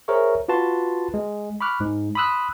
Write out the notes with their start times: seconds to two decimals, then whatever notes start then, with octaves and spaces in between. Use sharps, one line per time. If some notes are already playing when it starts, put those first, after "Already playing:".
0.08 G#4 A#4 C5 C#5 E5 C#6
0.48 F4 F#4 B4 A5 C6
1.14 G#3
1.61 B5 C#6 D6 F6 F#6
1.80 G#2
2.15 B5 C6 D#6 E6 F#6